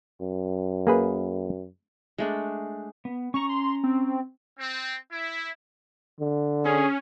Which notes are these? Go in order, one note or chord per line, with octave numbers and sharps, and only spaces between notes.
F#2
A#3 G#4 B4
G#3 A3 D4
B3
C#4 A#5 C#6
C6
C4
C4
E4
D3
C#4 G#4